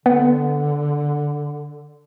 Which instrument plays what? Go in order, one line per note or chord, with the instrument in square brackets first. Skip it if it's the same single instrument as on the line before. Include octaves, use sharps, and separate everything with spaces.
[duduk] D3 [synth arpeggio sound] B3